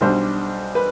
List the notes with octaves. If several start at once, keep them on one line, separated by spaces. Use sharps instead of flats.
B1 B2 G3 D4 C5
B4